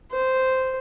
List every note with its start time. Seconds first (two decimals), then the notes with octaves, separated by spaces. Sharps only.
0.11 C5